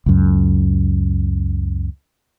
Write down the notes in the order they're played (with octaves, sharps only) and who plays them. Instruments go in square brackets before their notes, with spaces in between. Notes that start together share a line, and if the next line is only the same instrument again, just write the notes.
[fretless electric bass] C#2 F#2